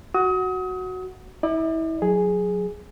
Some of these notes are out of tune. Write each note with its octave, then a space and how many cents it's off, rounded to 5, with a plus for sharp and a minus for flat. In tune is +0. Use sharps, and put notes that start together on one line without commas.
F#4 +0 F#5 +0 D#6 +35
E4 -30 D5 +35
F#3 -15 G#4 +0